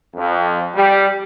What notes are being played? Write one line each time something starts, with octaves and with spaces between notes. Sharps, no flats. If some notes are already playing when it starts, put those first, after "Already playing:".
F2
G3